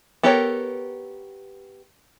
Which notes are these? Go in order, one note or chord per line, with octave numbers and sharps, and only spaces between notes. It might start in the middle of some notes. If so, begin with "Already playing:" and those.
B3 G4 A4 A#4 C#5